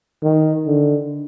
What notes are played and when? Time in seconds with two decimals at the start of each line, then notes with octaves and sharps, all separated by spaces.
0.23 D#3
0.67 D3